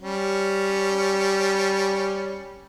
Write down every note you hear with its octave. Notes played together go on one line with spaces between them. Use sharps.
G3 C#4